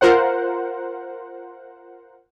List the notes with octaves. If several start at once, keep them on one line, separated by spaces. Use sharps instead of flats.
F4 A#4 C5 F#5